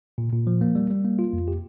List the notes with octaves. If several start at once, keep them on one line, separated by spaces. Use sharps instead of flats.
A#2
A#2
F3
A#3
G3
G3
A#3
F4
F2
G4